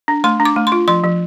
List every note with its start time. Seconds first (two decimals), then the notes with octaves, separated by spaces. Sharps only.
0.08 D4
0.24 A3 C6
0.40 D4
0.45 D6
0.56 A3
0.67 C6
0.72 F4
0.88 F3 C6
1.04 F3